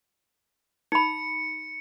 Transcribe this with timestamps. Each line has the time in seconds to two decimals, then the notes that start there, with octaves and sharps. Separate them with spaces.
0.92 D#4 B5 C#7